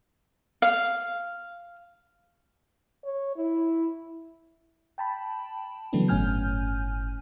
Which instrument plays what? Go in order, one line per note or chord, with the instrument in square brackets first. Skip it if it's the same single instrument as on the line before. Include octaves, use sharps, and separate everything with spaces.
[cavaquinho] F5
[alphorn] C#5
E4
[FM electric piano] G5 A5 B5
C#3 E3 F#3 A3 B3 D4
G1 A2 C#4 G#5 F6 G6